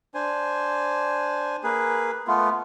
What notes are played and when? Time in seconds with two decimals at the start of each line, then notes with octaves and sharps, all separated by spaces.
0.14 D4 C5 G#5
1.64 A#3 G#4 B4
2.28 A3 B3 F4